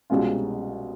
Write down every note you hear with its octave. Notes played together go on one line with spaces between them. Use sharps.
C2 B2 G#3 C#4 F4